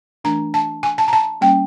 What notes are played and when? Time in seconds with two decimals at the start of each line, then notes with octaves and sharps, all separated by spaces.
0.24 E3 A3 D4 A#5
0.54 A5
0.83 G#5
0.98 A5
1.08 A#5
1.13 A5
1.41 G3 A#3 C#4 G5